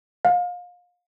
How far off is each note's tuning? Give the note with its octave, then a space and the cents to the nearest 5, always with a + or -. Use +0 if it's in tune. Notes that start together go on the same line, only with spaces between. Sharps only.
F5 +30